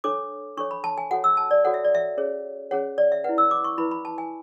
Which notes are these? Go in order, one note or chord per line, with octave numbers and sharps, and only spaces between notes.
D4 A4 C#5 D6
D4 A4 C#5 C#6
B5
A5
G#5
F#4 A4 C#5 F#5
E6
A5
D5
F#4 A4 C#5 F#5
E5
D5
E5
C#4 G#4 C#5
C#4 G#4 C#5 F#5
D5
E5
E4 B4 F#5
E6
D6
C#6
E4 B4 B5
B5
A5
G#5